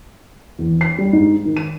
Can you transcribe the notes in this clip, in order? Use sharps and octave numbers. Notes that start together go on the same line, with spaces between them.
E2
C7
G3
G#2
D#3
D#7